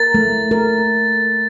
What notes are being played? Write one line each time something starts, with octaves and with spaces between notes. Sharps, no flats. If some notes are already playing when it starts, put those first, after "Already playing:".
Already playing: A#4 A6
A3
A#4